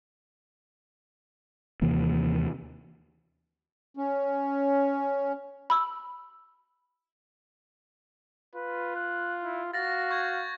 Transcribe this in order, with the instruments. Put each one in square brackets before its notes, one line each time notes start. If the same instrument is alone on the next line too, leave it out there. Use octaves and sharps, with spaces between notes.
[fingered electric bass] D#2 C3 E3 A#3
[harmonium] C#4
[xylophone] B5 E6
[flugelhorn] F4 [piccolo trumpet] B4
[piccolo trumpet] F#6
E4
[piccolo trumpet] F#4 [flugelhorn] F5 [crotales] A6 A#6
[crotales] C#6 G6 G#6